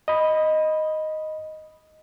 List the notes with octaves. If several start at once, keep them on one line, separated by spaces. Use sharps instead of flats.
D#5 B5